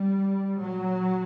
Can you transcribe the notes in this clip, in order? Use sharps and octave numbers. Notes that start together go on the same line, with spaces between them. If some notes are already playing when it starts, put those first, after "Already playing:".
Already playing: G3
A#2 F#3